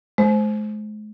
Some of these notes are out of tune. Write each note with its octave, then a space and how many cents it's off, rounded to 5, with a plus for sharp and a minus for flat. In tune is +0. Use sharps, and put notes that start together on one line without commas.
G#3 +40 C5 +0